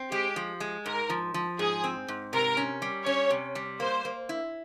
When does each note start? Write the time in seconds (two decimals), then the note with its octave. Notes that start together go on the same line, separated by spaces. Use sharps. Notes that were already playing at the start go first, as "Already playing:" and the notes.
Already playing: C4
0.12 G#3 G4
0.36 F3
0.60 G#3
0.86 G#2 A#4
1.10 F3
1.34 F3
1.59 G#2 G#4
1.84 C4
2.08 G#2
2.33 C3 A#4
2.57 C#4
2.82 G3
3.06 C#4 C#5
3.30 C3
3.55 G3
3.80 A#3 C5
4.05 A#3
4.29 E4